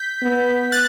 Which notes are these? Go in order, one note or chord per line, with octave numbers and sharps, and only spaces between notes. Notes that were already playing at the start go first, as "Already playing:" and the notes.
Already playing: G6 B6
B3
F#6 A6